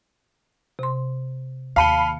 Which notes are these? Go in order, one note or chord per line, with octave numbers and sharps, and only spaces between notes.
C3 C6
D#2 F5 A5 B5 C#7 D#7 G7